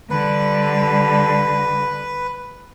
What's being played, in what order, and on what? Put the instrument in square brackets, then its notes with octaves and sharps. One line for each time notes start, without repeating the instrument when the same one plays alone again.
[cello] D3 G3 [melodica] B4